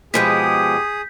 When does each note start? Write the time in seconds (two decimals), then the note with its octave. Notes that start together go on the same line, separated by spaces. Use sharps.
0.14 B2 F3 G#3 G4 G#4 D#6 G6 B6